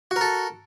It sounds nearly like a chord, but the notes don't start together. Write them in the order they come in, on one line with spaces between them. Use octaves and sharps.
F#4 A#4 A4